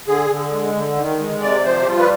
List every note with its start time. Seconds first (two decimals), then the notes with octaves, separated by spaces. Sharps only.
0.07 D3 G#4
0.30 D3
0.52 G#3
0.74 D3
0.97 D#3
1.19 G#3
1.42 C3 D5
1.64 F3 C5
1.82 G4
1.86 G3 F4
1.98 B4